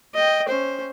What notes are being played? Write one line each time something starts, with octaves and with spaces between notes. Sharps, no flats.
D#5 G5
C#4 C5